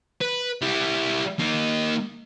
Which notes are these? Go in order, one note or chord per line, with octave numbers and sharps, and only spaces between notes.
B4
G3 E4
A#3 D#4